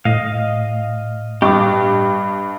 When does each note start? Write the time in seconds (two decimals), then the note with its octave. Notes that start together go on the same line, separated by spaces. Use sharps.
0.05 A2 D#5 F5
1.42 G2 G4 D#5 B5 D6